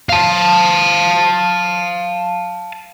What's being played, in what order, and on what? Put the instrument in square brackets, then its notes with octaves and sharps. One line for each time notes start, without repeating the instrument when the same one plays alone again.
[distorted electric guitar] F5 A5